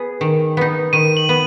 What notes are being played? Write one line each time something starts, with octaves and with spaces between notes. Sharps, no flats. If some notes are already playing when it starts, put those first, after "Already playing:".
Already playing: B3 G#4
D#3
B3 D#4
D#3 D#7
F#7
B3